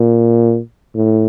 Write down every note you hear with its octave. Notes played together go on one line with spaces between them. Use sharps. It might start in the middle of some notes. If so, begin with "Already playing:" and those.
Already playing: A#2
A2